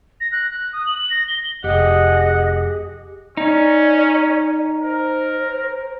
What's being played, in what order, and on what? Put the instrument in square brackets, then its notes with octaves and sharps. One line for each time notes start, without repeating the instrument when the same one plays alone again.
[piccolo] A#6
F#6
F#6
D#6
F#7
A#6
G7
[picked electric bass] F1 [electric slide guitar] G4 G#4 [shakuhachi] D#5 [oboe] F#5
[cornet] C#4 [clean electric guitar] D#4 [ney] D5
[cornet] A#4 [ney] C5